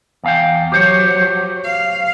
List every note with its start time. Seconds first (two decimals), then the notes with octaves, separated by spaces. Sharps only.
0.24 E2 F5 G5
0.72 F#3 G4 C5 C#5
1.65 F5